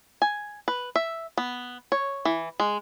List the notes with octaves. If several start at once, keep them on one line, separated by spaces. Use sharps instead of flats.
G#5
B4
E5
B3
C#5
E3
G#3